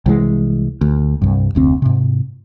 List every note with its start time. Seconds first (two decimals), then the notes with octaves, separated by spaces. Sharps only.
0.06 C2 E3 G3 G#3
0.81 D2
1.22 C2 G2
1.55 F1 D2 C4
1.82 G#2 C3